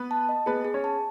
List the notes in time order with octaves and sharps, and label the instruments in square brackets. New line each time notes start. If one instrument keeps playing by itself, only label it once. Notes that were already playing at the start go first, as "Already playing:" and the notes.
Already playing: [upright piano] B3 B4
[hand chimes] A5
D#5
[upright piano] B3 B4 [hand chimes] G#4
[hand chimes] G#4
[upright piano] C#4 C#5
[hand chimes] A5